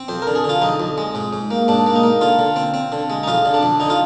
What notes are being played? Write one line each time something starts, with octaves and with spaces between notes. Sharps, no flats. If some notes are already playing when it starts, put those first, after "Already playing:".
Already playing: C4
F2 C5
D3 A#4
G#4
D3
F4
F2 D#4
F2
G#3
G#2
G#2
A#3
G#2 D4
A#3
D#4
A#3
D3 F4
D3
C4
C4
D3
G#3
D#4
F2 F4
D3
D4
F2
D3 D#4
F4